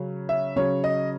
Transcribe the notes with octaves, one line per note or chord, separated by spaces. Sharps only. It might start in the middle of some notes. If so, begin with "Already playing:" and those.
Already playing: C#3 F#3 C#4
E5
C#3 F#3 C#4 C#5
D#5